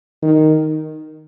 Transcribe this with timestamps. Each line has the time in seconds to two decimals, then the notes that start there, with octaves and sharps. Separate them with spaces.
0.22 D#3